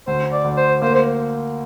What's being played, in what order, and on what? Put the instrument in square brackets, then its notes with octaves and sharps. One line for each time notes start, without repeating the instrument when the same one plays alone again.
[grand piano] D2 [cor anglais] C5
[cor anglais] D5
[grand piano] D2
[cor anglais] C5
[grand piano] A#3 [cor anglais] C5
[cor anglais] C5